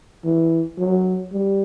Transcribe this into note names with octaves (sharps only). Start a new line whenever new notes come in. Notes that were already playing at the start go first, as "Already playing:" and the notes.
E3
F#3
G3